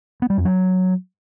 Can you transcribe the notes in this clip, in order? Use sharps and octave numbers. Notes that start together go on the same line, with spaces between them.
B3
G3
F2
F#3